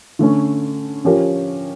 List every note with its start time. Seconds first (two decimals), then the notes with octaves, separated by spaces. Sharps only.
0.19 D3 A3 C#4
1.05 F3 C#4 G4 A#4 C#5